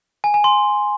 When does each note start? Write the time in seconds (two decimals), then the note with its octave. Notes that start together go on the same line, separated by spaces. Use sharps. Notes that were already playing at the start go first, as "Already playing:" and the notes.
0.24 G#5
0.34 G#5
0.44 C6